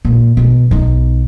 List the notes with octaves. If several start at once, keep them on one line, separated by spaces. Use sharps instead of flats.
A#2
B2
B1 D#4